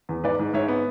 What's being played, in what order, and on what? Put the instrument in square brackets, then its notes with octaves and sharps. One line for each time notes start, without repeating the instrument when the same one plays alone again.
[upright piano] E2
G#2 B4 D5
G#2
G#2 C#5 E5
B3